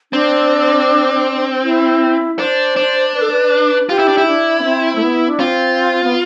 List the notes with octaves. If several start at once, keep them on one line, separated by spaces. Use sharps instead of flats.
C4 D4
E4
D4 C5
D4
B4
A4
B4
F4 G4
E4
D4
E4
D4
B3
C4
A3
B3
D4
C4 F4
B3